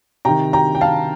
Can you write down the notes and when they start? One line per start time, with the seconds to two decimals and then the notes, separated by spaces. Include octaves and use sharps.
0.25 C3 D#3 G5 A#5
0.53 G5 A#5
0.75 G5
0.81 F5 A5